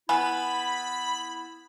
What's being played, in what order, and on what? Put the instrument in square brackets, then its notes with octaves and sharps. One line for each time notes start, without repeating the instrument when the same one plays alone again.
[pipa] B3 [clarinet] E4 [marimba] G#5 [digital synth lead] B5